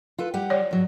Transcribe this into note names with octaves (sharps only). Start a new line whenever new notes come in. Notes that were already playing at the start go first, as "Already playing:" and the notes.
F4 A4 B4
G3 G4 F#5
C#5 D5
G#2 F#3